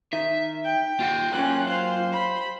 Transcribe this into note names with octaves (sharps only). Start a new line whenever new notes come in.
D#3 E5
G5
D#2 F4 F#5
F#2 F#3 A#3 C#4 F#6
C5 F5
B5